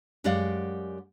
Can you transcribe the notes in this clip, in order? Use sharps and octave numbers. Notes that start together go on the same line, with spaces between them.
F#2 G#3 G4 D5 F5 F#5